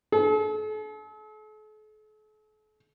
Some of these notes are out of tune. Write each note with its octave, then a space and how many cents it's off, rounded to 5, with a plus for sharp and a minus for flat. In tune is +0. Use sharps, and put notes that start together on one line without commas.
A4 -45